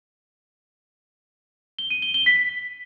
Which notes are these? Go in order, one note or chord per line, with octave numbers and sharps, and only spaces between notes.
G7
D#7
G7
G7
B6